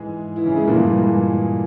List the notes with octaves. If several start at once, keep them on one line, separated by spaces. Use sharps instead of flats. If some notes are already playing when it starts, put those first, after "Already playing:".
Already playing: G#2 E3 G#3 G#4
E3 E4
C#3 C#4
G#3 G#4
G2 A#2 E3 A#3
G#3
G#3